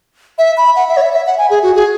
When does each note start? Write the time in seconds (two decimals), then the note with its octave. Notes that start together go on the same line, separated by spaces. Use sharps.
0.38 E5
0.57 B5
0.76 F#5
0.88 E5
0.97 C#5
1.02 E5
1.13 E5
1.27 F#5
1.38 G#5
1.50 G#4
1.63 F#4
1.75 G#4